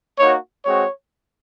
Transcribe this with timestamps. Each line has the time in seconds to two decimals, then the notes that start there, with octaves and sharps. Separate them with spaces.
0.19 A#3 D#4 F#4 C#5
0.65 G#3 C4 F#4 C#5